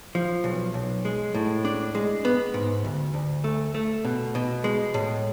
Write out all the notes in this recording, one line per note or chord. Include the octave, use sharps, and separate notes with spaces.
F3
B1
B1
G#3
A2
D4
G#3
B3
G#2
D2
D2
A3
A3
B2
B2
G#3
A2